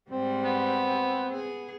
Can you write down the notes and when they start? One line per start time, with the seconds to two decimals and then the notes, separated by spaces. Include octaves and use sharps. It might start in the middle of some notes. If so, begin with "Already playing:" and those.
0.11 G#2 G3 C4
0.45 B3
1.31 B3 G#4